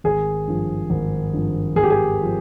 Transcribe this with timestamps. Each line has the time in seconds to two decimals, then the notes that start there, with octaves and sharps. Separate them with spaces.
0.04 G#1 G#4
0.48 G2 F3
0.90 G#1
1.33 G2 F3
1.76 G#1 G#4
1.83 G4
1.90 G#4
2.23 F3